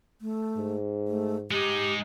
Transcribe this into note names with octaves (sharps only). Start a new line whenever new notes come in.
A3
G#2
A3
G#3 D#4 G4